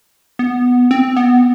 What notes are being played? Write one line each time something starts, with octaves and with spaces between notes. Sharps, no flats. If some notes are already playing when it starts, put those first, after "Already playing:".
B3
C4
B3